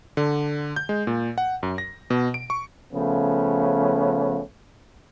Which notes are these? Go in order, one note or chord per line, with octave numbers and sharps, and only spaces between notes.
D3
G6
G#3
A#2
F#5
F#2
A#6
B2
D7
C#6
C#3 F3 A3 B3 C#4